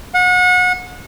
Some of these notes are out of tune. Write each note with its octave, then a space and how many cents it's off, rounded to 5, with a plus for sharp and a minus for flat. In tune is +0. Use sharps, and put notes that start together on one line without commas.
F#5 -30